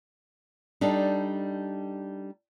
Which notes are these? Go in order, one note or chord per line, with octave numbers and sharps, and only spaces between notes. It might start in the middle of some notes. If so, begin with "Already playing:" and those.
G3 D4 D#4 A4